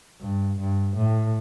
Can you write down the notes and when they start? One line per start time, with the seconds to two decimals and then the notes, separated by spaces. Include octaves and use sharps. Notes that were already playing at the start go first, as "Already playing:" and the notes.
0.21 G2
0.59 G2
0.96 A2